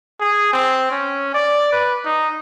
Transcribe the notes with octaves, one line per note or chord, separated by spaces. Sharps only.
G#4
C4
C#4
D5
B4
D#4